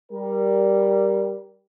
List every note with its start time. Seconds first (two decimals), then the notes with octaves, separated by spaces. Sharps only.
0.12 G3 A#4